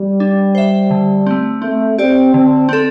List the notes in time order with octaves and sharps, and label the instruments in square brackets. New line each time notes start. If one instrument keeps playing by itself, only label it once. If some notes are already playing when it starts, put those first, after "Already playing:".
Already playing: [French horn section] G3
[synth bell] D4
C5 E5
D3
A3 C4
[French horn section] A3 [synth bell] C4
[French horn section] C4 [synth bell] G4 D5
[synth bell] D3 [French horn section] C4
[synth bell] C4 A4